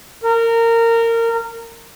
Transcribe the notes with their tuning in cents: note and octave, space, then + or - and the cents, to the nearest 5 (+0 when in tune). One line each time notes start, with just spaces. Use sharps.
A#4 -20